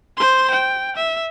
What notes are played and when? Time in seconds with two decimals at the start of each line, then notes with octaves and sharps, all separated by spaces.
0.18 C5 C6
0.51 G5
0.97 E5